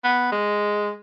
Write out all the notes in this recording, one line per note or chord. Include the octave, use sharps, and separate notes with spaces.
B3
G#3